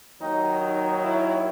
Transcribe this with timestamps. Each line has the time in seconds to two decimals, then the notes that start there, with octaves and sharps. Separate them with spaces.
0.21 D#2 D#3 F#3 D#4
0.62 D#4
1.03 E4